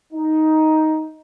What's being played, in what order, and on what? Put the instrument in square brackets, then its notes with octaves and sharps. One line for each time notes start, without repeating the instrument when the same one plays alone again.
[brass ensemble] D#4